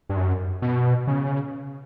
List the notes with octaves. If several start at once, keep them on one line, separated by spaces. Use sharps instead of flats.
G2
F#2
B2
C#3